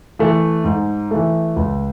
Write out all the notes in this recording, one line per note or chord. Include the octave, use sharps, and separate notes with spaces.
E3 A3
G#2
E3 A3
C#2